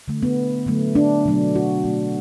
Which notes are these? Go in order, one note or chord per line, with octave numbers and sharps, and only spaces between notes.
D3 A3
B3
D3 F#3 A3
D4
B2 F#3 A3
F#4
B2 F#3 A3